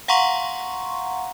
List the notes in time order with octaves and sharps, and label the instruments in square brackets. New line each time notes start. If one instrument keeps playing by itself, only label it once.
[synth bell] F5 F#5 A#5 C6 C#6